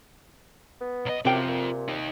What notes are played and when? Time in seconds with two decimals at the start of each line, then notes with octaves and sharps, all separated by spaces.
0.81 B3
1.06 B1 D#5
1.25 F#2 C3 C4 F4 G5
1.49 A#2
1.88 D#4 G4